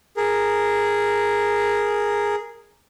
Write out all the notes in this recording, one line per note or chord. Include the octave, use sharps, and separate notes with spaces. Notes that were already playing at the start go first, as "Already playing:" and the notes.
G#4 A#4